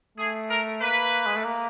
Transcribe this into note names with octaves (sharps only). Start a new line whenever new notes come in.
A3 G#4
A#4
A#3 B4
G#3
A3
A#3